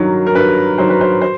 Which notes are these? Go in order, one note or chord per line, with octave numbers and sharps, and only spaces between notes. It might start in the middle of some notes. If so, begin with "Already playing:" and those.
Already playing: G2 D#3 F#3 A#4
A#4
G2 B4
D#3 F#3 C5
B4
C5
C5